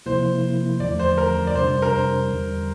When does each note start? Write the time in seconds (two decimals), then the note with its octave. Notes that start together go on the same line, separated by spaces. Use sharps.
0.06 C3 F3 A#3 E4 C5
0.80 E2 D3 F3 A3 D5
1.00 C5
1.18 A#4
1.47 D5
1.55 F2 C3 G3 D4 C5
1.82 A#4
1.92 C5
2.30 E2 D3 G3